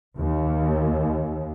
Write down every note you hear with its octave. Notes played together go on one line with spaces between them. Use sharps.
D#2